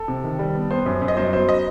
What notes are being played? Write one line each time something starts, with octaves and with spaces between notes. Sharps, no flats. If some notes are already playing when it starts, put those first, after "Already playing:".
Already playing: A4
C3
D#3
G3
B3
B3 C5
F#2
F#2
D#5
F#3 C5
B3 C5
D#5